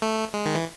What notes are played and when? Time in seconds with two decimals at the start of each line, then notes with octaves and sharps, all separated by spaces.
0.02 A3
0.34 G#3
0.46 D#3
0.55 E3